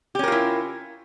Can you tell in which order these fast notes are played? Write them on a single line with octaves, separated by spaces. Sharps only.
G4 C#4 A#4 F4 E4